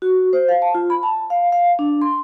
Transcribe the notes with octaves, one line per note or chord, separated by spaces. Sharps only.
F#4
C5
F5
A5
F4
B5
A5
F5
F5
D4
C6